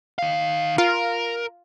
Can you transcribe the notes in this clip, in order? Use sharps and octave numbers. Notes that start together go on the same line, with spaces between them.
D#3 F5
F4 A#4